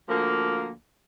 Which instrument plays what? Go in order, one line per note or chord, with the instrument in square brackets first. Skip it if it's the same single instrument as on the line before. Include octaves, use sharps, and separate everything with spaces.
[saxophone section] D2 F3 A#3